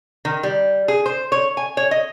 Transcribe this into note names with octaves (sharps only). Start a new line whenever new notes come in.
D#3
G3
G#4
C5
C#5
G#5
C#5
D#5